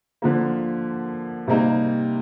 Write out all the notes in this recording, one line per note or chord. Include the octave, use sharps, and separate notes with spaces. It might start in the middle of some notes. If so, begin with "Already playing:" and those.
D3 F3 A#3
C3 G3 A#3 D#4